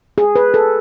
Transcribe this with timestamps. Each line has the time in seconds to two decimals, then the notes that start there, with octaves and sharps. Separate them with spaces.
0.18 G#4
0.36 B4
0.54 A4